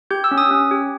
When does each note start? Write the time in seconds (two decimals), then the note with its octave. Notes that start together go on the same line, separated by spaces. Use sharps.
0.11 G4 G6
0.24 E6
0.31 C#4
0.38 D#6
0.51 C#4
0.71 G4